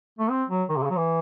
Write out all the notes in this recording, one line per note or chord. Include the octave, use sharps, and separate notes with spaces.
A3
C4
F#3
D#3
C3
C#3
F#3
E3